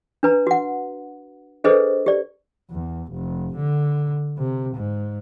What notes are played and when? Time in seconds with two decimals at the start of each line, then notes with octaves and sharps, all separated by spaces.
0.23 D4 B4 A#5
0.47 F#4 F#5
1.64 D4 G#4 A4 B4 C5 D#5
2.06 G4 D5
2.71 E2
3.12 F1
3.55 D3
4.37 C3
4.75 G#2